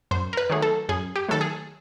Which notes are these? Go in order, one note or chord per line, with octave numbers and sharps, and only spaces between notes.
F#2 C5
A#4
B4
D#3 F#3 A3 G#4
A4
F#2 G#4
G4
D#3 F#3 A3 A4
G#4